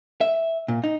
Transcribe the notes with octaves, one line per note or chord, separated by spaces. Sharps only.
E5
A#2
D#4